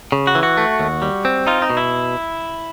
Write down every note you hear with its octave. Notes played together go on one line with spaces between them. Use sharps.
C#3
F#4
E3
F#4
A3
D#2
G3
C4
D#4 F4
D#4
B2
E4